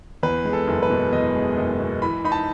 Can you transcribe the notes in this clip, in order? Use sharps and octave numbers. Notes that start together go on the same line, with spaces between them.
E2 B4
G#3
A4
F#1
B4
B2
E2 D#5
G#3
F#1
B2
E3 B5
D#4 B5
A5